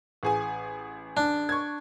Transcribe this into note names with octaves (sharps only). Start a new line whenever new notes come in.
A1 G#4 G#5
D4
C#6 G#6